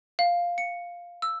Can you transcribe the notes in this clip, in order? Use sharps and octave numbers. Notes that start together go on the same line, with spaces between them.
F5
C#7
E6